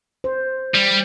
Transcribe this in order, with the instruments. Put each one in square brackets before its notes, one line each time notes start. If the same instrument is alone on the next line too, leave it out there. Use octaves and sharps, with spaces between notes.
[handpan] C5
[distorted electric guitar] G3